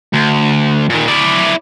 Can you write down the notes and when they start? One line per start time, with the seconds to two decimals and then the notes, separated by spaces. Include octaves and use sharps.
0.13 D2
0.90 A#2 D#3
1.08 E4 D5